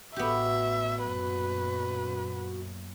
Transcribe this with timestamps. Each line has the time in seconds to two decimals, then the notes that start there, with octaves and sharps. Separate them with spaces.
0.16 A1 B3 F#4 G4 E5
1.05 F#2 A#2 B4